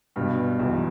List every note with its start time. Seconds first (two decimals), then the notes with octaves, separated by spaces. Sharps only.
0.16 G2 B2 G3
0.59 B1 E2 E3